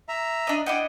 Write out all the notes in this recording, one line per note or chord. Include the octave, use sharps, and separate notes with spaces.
E5 A#5
D4 D#5
D4 E4 D#5 F#5 G5